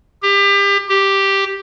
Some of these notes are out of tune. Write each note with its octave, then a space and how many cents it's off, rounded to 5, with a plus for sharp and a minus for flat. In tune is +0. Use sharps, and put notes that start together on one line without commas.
G4 +30
G4 +0